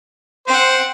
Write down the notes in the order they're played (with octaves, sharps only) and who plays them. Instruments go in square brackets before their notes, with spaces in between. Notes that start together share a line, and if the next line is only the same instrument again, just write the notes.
[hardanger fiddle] C4 F#5 [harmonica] C5